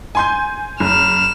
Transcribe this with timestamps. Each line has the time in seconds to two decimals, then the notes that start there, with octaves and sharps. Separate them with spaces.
0.15 G#5 C6 G6
0.80 F#1 F6 E7